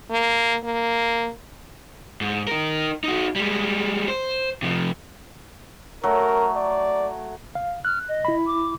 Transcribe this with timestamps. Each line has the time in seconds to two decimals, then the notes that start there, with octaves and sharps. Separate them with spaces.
0.11 A#3
0.64 A#3
2.21 G#2
2.47 D#4 A#4
3.04 D#4 F#4
3.36 G3 G#3
4.08 C5
4.62 C3 F3
6.03 F#3 A3 A#4
6.56 D5
7.55 F5
7.85 F6 F#6
8.08 D#5
8.25 E4 B5
8.46 D6